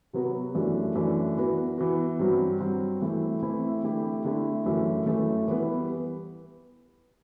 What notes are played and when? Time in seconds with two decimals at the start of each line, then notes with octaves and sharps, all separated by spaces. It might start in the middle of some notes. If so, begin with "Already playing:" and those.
0.13 C3 F#3 B3 F#4
0.55 F#2 E3 A3 D4
0.95 F#2 E3 A3 D4
1.37 E3 B3 F#4
1.78 E3 B3 F#4
2.19 G2 F#3 C4 F#4
2.59 G2 F#3 C4 F#4
3.02 E3 A3 C4 E4
3.43 E3 A3 C4 E4
3.84 D3 A3 E4 G4
4.25 D3 A3 E4 G4
4.66 F#2 E3 A3
5.06 F#2 E3 A3
5.48 E3 G3 B3